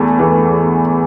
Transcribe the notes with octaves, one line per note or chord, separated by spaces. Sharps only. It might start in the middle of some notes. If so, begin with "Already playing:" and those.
Already playing: E2 E3 A3
E2 E3 A3